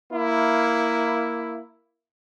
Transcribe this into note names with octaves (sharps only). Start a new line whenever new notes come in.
A#3 E4